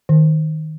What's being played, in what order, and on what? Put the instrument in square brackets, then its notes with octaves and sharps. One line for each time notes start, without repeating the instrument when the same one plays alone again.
[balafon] D#3